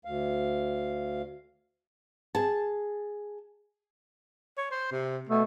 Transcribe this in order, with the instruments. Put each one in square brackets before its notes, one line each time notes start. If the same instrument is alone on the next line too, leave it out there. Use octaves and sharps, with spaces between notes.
[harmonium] D2 F5
[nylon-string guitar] G#4 A5
[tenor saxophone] C#5
C5
C3
[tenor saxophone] B2 [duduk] A3